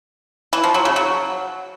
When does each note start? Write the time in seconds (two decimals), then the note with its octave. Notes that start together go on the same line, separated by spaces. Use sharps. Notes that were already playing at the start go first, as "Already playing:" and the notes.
0.53 E3
0.64 F3
0.74 F#3
0.85 C#3
0.96 F#3